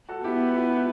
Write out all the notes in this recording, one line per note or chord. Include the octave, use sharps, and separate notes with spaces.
F#4 A4
B3 E4 G4
E4 G4
E4